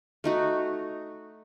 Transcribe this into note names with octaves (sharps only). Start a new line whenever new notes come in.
A3 D#4 F#4